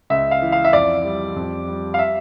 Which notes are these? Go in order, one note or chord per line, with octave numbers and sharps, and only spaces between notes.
C#2 E5
F5
E3
F5
E5
F2 D5
G3
F2
G3
F5
E5